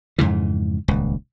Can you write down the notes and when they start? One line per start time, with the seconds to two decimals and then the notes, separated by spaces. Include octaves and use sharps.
0.18 F2 G#2 C#3 E3
0.88 D#1 C#2